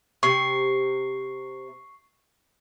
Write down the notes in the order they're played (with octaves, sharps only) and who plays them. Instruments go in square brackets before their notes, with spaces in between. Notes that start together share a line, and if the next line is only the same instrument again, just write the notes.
[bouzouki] C3 [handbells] C#6 C7